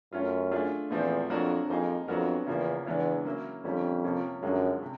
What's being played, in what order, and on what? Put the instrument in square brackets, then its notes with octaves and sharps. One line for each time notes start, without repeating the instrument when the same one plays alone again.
[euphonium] F#2 [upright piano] A3 C#4 F4
[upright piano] A3 D4 F4 G#4
[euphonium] E2 [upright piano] A#2 F3 A3 C4
[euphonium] F2 [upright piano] F#3 A#3 D4 F#4 A#4
[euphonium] F2 [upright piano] A#3 D#4 G#4
[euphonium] F2 [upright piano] F#3 B3 D4 F#4 A#4
[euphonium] E2 [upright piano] C#3 F3 A#3
[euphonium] E2 [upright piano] C#3 E3 G#3 B3 D4
[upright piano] F#3 A#3 C#4 E4
[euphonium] F2 [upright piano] D3 G3 A#3 C#4
[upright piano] C3 F3 A#3 C#4
[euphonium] F#2 [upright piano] D3 F3 G#3 C#4
[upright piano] C3